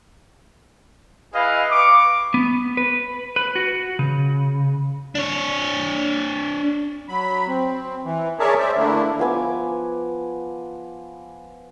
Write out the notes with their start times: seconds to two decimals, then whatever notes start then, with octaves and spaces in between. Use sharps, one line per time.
1.34 E4 G#4 B4 D#5 F5
1.72 B4 C#6 D6
2.34 B3
2.77 B4
3.36 B4
3.55 F#4
3.99 C#3
5.15 D4 C#5
7.08 F#3 B5
7.48 C4
8.04 E3
8.39 G#4 A#4 C#5 D5 E5 A5
8.59 C5 D5 E5
8.77 D3 A3 A#3 D4 E4
9.19 F3 B3 G#5 D6